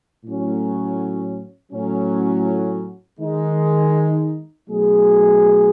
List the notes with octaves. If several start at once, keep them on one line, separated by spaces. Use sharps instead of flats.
A2 F#3 C#4
A2 F#3 C#4
D#3 G#3 D#4
B2 F#3 A3 D#4 G#4